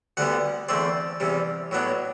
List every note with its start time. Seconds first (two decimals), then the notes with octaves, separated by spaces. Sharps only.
0.17 D2 D3 G3 B3 F#5
0.69 E2 D3 A3 C4 D5
1.20 E2 C3 G3
1.71 A2 F#3 B3 D4